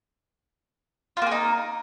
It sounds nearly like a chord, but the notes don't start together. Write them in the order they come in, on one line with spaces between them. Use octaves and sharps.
F4 A#3 G#4 D#4